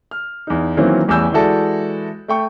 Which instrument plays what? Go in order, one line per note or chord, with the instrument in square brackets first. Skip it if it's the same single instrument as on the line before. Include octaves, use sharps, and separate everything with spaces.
[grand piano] F6
E2 D#4
D#3 E3 F#3 A#3 C4 C#4
A1 E2 G3 G#5 E6 G6
E3 G#3 E4 F#4 A4 D5
A3 G5 C#6